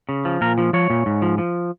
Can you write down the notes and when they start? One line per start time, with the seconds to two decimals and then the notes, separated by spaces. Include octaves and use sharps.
0.09 C#3
0.25 F3
0.41 A#2 A#4
0.58 F3
0.73 F3 C#5
0.90 A#2
1.06 G#2
1.22 F3
1.38 F3